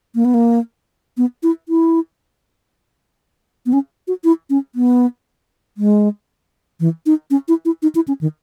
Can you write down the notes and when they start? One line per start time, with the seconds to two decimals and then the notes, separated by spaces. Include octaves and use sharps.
0.15 A#3
0.25 B3
0.34 A#3
1.17 B3
1.43 E4
1.69 E4
3.66 B3
3.73 C#4
4.08 F#4
4.24 E4
4.50 C#4
4.75 B3
5.78 G#3
6.80 E3
7.06 D#4
7.31 C#4
7.48 E4
7.65 E4
7.82 D#4
7.95 E4
8.08 C#4
8.21 D#3